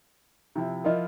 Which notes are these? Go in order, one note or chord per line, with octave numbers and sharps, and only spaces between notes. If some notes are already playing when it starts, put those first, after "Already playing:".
C3 F3 E4
F3 E4 F4 A#4 D#5